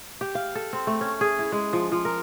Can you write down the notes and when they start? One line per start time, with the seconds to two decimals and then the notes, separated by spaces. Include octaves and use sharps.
0.21 G4
0.35 F5
0.55 A4
0.73 C4
0.87 A3
1.01 C#4
1.21 G#4
1.39 E4
1.52 G#3
1.73 F3
1.92 F3
2.05 A#4